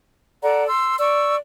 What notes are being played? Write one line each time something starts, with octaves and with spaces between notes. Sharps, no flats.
A4 D5 F#5 A#5
C6 E6
D5 C#6 E6